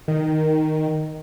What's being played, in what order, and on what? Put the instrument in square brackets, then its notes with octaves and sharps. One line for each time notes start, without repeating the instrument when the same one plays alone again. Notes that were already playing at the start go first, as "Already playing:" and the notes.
[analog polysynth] D#3